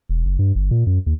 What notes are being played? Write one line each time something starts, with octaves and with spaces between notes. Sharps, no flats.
E1
F#1
G2
G1
A#2
F#2
D#2